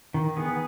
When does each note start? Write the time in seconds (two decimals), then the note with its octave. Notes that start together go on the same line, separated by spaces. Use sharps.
0.14 D#3
0.37 B3 G#4